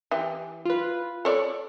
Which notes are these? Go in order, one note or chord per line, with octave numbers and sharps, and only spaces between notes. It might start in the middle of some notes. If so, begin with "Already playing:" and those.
E3 G4
F4 B4
A4 C#5 D5